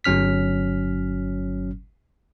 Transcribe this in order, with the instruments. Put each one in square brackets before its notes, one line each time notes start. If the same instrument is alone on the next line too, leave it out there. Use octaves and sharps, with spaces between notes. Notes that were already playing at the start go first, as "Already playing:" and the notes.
[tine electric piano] G1 F#3 C#4 F6 B6